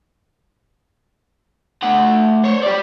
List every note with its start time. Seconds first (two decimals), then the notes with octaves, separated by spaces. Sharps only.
1.82 A3 F#5
2.43 C5 C#5
2.62 G4 D5